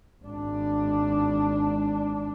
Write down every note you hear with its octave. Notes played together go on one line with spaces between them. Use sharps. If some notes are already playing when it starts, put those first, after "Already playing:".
G#1 D4